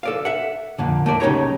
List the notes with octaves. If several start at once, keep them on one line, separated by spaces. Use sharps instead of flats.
A4 D5 F5
E5 F#5
F2 A#2 D3
A3 A#3 D5
B1 C#3 D#4 G4 C#5 A#5